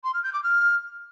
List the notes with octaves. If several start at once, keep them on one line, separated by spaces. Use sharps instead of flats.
C6
F6
G6
D6
F6